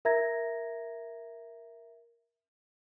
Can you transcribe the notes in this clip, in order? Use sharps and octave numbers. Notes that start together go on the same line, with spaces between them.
A#4 E5 A#5 G#6 A#6